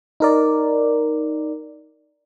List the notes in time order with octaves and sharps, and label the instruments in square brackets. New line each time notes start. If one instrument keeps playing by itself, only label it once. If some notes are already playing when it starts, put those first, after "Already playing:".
[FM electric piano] D#4 A#4 D5